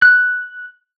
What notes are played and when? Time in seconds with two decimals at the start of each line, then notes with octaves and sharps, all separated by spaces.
0.02 F#6